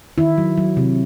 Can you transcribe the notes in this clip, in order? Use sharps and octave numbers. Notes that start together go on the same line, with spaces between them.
D#3 E4
F#3
F#3
C3